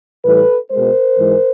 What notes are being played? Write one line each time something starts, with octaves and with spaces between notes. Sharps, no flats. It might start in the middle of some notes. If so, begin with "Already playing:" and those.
A2 E3 G3 A4 B4
B2 G#3 A#4 C5
G#2 E3 G#3